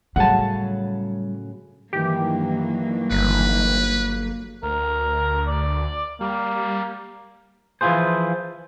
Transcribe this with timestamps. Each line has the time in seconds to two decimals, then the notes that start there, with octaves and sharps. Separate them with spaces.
0.16 A2 C#3 F#3 G3 F#5 A5
1.93 G2 D#3 E3 F#3 A#3 G4
3.11 G1 B4
4.63 D2 A#4
5.47 D5
6.21 G3 A#3
7.81 E3 F3 E4 F4 G#4 C5